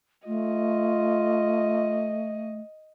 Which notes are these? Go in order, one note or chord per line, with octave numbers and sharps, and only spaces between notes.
A3 F4 D#5